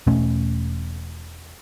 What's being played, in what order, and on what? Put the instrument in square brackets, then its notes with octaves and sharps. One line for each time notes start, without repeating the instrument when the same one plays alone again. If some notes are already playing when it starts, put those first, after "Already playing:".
[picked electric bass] E1 B2 A3 C#4